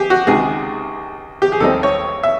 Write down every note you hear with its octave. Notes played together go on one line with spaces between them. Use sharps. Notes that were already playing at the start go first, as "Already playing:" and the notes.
Already playing: G4 G#4
F#4
C#2 C3 D#3 G#3 G#4
G4
G#4
D#2 D#3 G3 C4 D#4 A4
C#5
E5